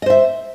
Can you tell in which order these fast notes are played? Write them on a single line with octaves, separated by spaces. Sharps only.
D#5 C5 E5